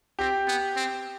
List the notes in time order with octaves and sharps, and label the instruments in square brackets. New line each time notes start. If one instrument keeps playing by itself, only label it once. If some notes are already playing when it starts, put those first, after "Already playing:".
[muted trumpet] C4 [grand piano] G4
[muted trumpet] B3
C4